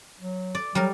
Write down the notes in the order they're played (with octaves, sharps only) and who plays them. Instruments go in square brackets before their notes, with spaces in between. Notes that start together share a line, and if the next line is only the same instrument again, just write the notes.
[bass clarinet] F#3
[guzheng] D5
[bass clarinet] F#3 [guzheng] G3 A#4